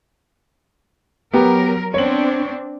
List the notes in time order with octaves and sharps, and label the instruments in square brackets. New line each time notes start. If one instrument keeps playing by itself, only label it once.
[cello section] F#3 A#4 [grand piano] B3 G4
[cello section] B3 C4 D4 [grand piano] C#5 F#7